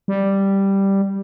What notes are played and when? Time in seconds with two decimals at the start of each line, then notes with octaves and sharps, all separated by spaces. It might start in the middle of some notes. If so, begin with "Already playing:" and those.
0.08 G3